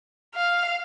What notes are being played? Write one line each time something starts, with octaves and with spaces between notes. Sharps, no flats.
F5